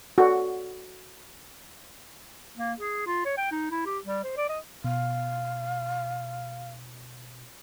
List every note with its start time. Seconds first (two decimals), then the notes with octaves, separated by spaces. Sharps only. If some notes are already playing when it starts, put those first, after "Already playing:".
0.18 F#4 A4 D5
2.58 A#3
2.79 G#4
3.07 F4
3.25 C#5
3.37 G5
3.52 D#4
3.71 E4
3.86 G4
4.04 G3
4.24 C5
4.37 D5
4.49 D#5
4.84 B2 F5